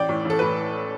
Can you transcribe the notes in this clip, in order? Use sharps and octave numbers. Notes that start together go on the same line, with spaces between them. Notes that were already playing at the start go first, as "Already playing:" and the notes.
Already playing: A1 D5 G5
A2 E3
A1 A4
A2 E3 B4